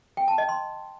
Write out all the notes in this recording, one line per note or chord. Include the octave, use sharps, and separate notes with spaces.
G5
A5
D#5
C6